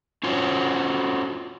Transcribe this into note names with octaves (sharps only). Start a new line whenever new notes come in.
C#4 F4 F#4 C5 C#5